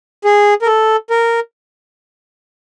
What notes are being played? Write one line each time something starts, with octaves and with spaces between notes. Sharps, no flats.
G#4
A#4
A4
A#4